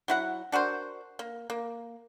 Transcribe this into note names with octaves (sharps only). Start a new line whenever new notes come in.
F#3 E4 F#5
D4 F#4 A#4 C5
A#3
A#3